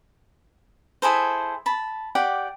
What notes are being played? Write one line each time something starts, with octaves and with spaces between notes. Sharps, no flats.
E4 G#4 A4 C5
A5 B5
G4 D5 F#5 G5